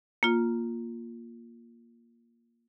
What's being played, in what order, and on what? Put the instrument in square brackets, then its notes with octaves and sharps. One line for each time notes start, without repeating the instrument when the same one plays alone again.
[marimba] A#3 F4